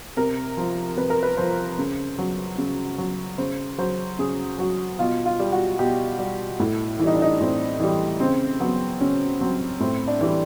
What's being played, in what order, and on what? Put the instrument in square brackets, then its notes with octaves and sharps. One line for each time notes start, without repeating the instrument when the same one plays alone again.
[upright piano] C3 A#4
F3
C3 B4
A#4
B4
F3 C5
C#3
F#3
C#3
F#3
C#3 C5
F#3 C5
C#3 G#4
F#3 F#4
B2 F4
F4
G3
F#4
B2 G4
G3
A2 E4
E3 E4
G3 D#4
D4
D#4
A2 C4
E3 G3
C#3 C4
F#3 B3
C#3 C#4
F#3 C4
A2 C4
D4
E3 G3